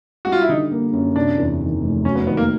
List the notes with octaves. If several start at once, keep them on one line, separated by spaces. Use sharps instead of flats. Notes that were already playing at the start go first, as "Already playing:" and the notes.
G3 F#4
F4
E4
D3 D#4
A#3
F#2
C3 D4
E2
D#3
F1
F#3 C#4
B3
D#3 B3
A#3